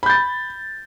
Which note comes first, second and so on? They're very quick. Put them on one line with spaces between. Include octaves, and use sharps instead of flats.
B5 G6 A6